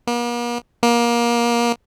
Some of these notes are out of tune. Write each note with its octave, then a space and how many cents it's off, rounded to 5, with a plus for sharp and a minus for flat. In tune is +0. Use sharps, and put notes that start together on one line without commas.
A#3 +45
A#3 +25